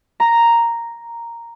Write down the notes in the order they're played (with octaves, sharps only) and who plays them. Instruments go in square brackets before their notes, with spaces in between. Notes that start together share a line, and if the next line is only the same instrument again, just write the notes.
[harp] A#5